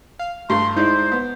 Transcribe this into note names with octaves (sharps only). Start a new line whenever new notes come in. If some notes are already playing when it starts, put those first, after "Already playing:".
F5
G2 A3 C6
G#3 D#4 E4 C5 D5
B3